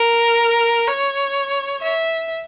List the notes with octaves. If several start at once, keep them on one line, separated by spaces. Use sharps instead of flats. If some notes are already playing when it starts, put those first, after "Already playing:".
Already playing: A#4
C#5
E5